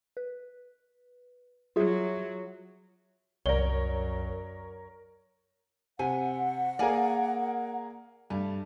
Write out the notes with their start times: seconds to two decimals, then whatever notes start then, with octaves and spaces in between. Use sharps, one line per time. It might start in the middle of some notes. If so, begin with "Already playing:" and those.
0.17 B4
1.76 F#3 F4 G#4 E5
3.46 C2 F#2 A#4 C#5 D5 G7
5.99 C3 F#5 G#5
6.79 A#3 G#4 A#4 D5 F5 G#5
8.30 G2 A3